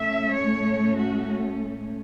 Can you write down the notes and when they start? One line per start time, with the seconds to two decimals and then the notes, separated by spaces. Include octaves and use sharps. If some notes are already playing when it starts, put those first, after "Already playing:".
Already playing: A2 A3 C#4 E5
0.35 C#5
0.97 F#4